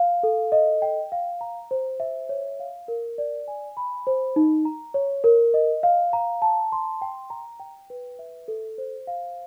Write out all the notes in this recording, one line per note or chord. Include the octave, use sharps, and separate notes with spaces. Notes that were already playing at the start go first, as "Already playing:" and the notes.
Already playing: F5
A4
D#5
G5
F5
A#5
C5
E5
C#5
F5
A#4
D5
G#5
B5
C5
D#4
A#5
C#5
A#4
D#5
F5
A#5
A5
C6
G5
A#5
G5
B4
E5
A4
C5
F5